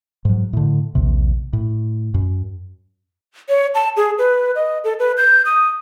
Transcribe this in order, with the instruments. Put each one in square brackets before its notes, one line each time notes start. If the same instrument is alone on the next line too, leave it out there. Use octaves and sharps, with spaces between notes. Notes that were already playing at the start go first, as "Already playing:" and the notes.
[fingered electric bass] G#2 F#3
A2 D3
A#1 D#2 C3
A2
F#2
[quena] C#5
A5
G#4
B4
D#5
A4
B4
G6
D#6